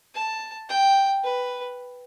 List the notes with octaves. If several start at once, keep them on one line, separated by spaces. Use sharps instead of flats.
A5
G5
B4